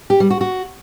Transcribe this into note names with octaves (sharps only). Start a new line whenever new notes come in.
G4
G3
F#4
F#4